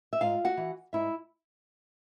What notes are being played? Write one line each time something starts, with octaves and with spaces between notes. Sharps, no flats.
E5
G#2 F4 F5
F#4 F#5
E3
G#2 E4 E5